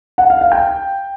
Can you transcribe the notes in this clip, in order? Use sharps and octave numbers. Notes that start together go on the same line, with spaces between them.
F#5
F5
F5
G5